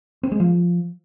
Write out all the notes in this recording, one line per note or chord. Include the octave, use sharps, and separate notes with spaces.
C4
G#3
F3